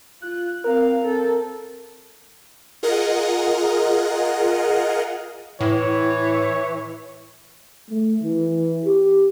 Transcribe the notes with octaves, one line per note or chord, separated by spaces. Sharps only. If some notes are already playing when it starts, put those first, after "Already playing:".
F4 F#6
C4 A#4 F5
C4 A4
F4 G#4 A#4 D#5 F#5
A2 E3 C#5
A3
E3
G4